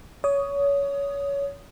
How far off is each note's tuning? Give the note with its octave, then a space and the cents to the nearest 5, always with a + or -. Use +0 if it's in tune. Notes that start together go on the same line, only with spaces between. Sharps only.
C#5 +25 D#6 +0